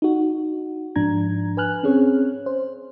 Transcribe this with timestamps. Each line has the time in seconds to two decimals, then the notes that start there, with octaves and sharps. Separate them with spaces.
0.02 D#4 F#4
0.96 G#2 F3 D4 A#5 G#6
1.57 B4 G#5 F6 F#6
1.83 C4 C#4 G#4 C#5
2.46 C5